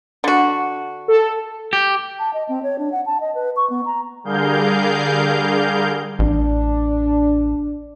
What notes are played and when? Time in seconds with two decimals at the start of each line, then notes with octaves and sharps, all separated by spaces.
0.24 D3 F#4
1.08 A4
1.73 G4
2.19 A5
2.34 D#5
2.49 C4
2.63 C#5
2.79 D4
2.92 F#5
3.06 A5
3.20 D#5
3.35 B4
3.56 C#6
3.70 B3
3.86 A#5
4.24 D3 G3 G#4 A#4 F5 G6
6.19 A1 D4